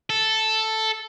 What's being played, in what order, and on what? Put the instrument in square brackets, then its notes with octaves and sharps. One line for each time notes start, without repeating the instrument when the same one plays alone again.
[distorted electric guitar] A4